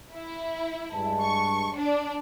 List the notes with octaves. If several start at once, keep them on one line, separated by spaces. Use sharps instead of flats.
E4
G2 G#3 A5
C#6
D4